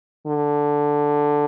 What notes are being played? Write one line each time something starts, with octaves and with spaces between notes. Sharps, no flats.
D3